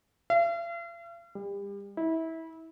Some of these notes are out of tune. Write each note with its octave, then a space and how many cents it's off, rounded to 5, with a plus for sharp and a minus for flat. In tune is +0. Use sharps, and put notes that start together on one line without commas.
F5 -45
G3 +35
E4 -25